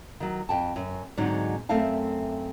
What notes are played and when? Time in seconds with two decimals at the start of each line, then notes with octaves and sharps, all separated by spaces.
0.20 D#3 F#3
0.49 F2 G5 A5
0.76 F#2
1.17 G#2 D3 F#3 C4 D#4
1.69 F#2 A3 C4 E5 F5 A5